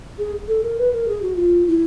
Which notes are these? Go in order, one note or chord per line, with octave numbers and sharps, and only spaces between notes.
G#4
A4
A#4
B4
A#4
G#4
F#4
F4
E4